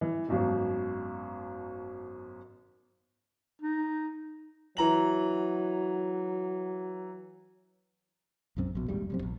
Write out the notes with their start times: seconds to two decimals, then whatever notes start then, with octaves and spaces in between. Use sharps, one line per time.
0.01 E3
0.28 G#1 F#2 B2
3.62 D#4
4.77 E3 F#3 A#5 F#7
8.57 B1 F#2 C4
8.75 A#1 B2
8.88 E1 D#2 G#2 G3
9.10 F1 F#2 C4
9.22 A#1